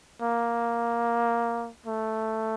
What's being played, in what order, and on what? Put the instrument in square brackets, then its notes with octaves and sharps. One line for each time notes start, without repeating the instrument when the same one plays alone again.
[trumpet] A#3
A3